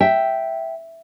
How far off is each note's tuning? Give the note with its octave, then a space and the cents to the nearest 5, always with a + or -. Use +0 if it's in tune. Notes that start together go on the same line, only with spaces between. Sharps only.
E5 +0 G5 -5